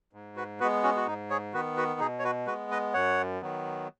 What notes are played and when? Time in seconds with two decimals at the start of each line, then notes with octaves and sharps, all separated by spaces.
0.13 G#2
0.36 F#4 B4
0.60 G#3 B3 F#4 B4
0.83 C#4 F#4
0.96 F#4
1.07 G#2 D#4
1.30 G#4 C#5
1.53 D#3 B3 F#4 B4
1.77 F#4 B4
2.00 B2 D#4 G#4
2.19 C#5
2.24 F#4 B4
2.47 G#3 F#4 B4
2.51 B3
2.71 B4 D#5
2.94 F#2 C#5 F#5
3.41 D#3 F#3 B3